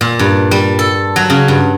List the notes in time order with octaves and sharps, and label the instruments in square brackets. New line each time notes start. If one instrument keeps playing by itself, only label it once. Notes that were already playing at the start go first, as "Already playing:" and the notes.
[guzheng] A#2
G2
G3
A4
F#3
C#3
G2